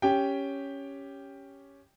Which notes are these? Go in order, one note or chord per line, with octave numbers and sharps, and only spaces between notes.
C#4 G4 G5